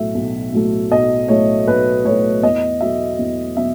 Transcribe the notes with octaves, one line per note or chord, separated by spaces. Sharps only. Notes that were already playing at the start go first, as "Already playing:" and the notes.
Already playing: B1 A2 F#3 A3 E5
B1
A2 F#3 A3
B1 D#5
A2 F#3 A3 C#5
B1 B4
A2 F#3 A3 C#5
E2 D#5
B2 F#3 A3 E5
E2
B2 F#3 E5